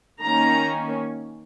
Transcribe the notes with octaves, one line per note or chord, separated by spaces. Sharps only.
D#3 A#3 C#4 A#5